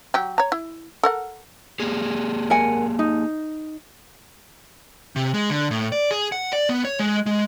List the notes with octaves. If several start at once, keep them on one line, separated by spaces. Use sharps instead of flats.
F#3 G4
C#5 A#5
E4
A4 A#4 F#5
A#3 G4 G#4
A#4 F#5 G#5
D#4
C3
G#3
D3
A2
D5
G#4
F#5
D5
B3
C#5
G#3
G#3